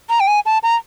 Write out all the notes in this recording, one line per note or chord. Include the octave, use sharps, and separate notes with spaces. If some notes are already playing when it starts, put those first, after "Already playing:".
A#5
G5
G#5
A5
A#5